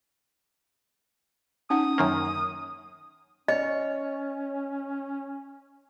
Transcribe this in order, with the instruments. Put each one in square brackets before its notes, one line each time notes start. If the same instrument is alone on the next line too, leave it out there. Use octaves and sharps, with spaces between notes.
[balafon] C#4 D#4 F#5 [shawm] D#6
[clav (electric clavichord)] F#2 D#3 A#3
[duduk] C#4 [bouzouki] C#5 [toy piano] D#5